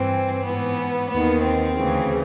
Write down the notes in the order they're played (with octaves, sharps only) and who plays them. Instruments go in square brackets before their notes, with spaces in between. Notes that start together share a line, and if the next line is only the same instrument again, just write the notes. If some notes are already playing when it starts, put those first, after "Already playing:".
Already playing: [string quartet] G2 E3 C4
G#2 E3 B3
D#2 D#3 B3
C4
D2 C#3 E3